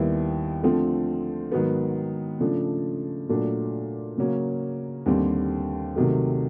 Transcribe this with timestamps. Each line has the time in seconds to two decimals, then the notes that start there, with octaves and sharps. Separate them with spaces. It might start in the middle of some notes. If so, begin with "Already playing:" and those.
Already playing: D#2 D#3 G3 B3 E4
0.62 D3 F3 A3 C4
1.52 G#2 D#3 F#3 B3
2.40 C#3 F3 A3 D4
3.29 A#2 F#3 A3 D4
4.18 C#3 F#3 A#3 C#4
5.06 D#2 D3 G3 C4
5.95 C3 D#3 F#3 A3